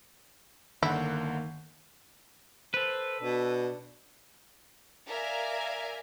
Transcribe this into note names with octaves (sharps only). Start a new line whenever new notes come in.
G1 D3 D#3 A#3 E4 F#5
A4 B4 C5
B2 D4
A#4 D5 E5 F5 G#5